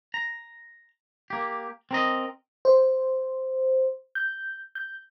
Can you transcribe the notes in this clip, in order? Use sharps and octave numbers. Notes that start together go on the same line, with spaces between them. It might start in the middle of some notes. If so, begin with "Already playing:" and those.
A#5
A#3 G4
C4 A#4 D#5
C5
G6
G6